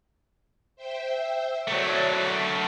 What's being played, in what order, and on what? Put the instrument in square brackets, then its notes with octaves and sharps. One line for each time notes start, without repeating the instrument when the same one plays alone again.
[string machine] C5 E5 G5
[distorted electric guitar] F#3 A3 [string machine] C#5 D5 E5
[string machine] A5